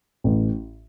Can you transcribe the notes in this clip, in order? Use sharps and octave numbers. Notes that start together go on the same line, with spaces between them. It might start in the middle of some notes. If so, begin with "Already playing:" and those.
A1